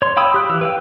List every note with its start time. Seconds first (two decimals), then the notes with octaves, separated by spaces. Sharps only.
0.02 C#5 C6
0.17 F5 G5 B5 D#6 E6
0.34 G4 F#6
0.49 E3 E6
0.61 B4 F5 G5